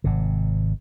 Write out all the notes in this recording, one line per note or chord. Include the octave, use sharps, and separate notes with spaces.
G#1 C3